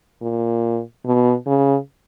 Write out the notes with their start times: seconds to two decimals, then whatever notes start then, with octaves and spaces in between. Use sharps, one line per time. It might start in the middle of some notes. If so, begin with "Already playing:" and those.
0.21 A#2
1.05 B2
1.46 C#3